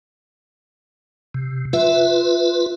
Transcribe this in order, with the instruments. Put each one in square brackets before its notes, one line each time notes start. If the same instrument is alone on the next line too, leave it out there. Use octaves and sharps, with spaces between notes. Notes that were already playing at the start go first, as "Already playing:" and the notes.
[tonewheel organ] C3
[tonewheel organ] F4 B4 [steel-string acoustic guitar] E5